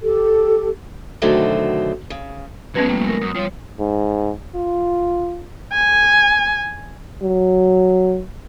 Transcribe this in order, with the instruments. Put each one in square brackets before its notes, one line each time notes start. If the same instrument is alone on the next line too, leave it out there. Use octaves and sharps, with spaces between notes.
[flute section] G4 A4
[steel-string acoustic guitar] B2 D3 D#3 F#3 A3 C4
C#3
[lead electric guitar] F#3 G#3 [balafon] B3 C#4 B4
[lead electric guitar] F3 A3 [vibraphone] G3 A#3
[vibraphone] G#3 A#4
[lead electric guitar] F#2 [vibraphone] D#6
[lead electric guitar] F3 F4 [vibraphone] G3 C#5
[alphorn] G#2
F4
[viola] G#5
[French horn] F#3